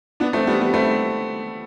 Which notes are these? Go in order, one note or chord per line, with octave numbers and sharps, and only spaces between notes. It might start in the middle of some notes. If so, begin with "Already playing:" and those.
B3 D4
A3 C4
G3 B3
G3 B3
A3 C4